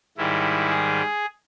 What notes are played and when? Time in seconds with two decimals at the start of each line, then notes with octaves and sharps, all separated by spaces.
0.17 G#2 D#3 G3 E4
0.70 G#4